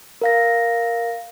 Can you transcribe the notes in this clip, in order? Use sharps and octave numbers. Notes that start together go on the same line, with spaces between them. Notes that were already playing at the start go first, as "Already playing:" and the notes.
A#4 F5 A#6